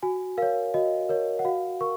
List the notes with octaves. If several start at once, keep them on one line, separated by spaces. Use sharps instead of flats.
F#4 G#5
A#4 C#5 F5
F#4 D#5
A#4 C#5
F#5
F#4 F5
A#4 C#6